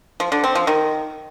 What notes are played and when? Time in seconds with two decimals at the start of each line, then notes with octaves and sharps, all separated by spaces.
0.20 F3
0.32 D3
0.44 C4
0.55 F3
0.67 D#3